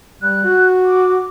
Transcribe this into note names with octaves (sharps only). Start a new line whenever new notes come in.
G3 F#6
F#4
D6